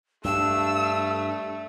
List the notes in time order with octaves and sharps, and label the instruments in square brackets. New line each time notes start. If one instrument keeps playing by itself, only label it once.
[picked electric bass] G2 [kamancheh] A3 [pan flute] D4 [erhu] E6